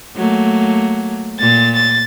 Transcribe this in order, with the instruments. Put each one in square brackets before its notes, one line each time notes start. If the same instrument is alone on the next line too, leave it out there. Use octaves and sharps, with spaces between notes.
[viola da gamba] F#3 A3 A#3
[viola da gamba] A#2 [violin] A6
[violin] A6